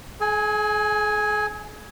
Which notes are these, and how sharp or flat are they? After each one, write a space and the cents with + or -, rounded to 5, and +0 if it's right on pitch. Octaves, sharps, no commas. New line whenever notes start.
G#4 +40 G#5 +0